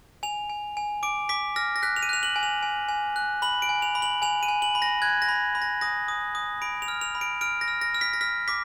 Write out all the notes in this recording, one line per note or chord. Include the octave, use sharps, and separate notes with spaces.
G#5 F7
G#5
G#5
D6 D7
D6 B6
F6 A#6
A#6
F#6 B6
F7
D#7
F#6 F7
F#7
G#5
F7
G#5
G#5
F#6
B5 F#7
D7
G#5
F7
B5
F#7
G#5 F7
D#7
G#5
F#7
B5
A#6
F#6 G#6
A#6
B5
B5
A#6
D#6 A#6
D#6
D#6
B5 D7
F7
F6
F7
B5
D7
F6 D7
A#6
F6
A#6
F6
B6
A#6
F6 B6
D6 B6